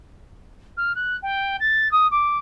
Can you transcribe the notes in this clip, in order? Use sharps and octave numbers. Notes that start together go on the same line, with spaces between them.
F6
F#6
G5
A6
D#6
D6